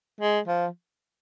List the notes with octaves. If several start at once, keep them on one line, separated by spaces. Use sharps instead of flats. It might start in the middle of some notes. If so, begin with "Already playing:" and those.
G#3
F3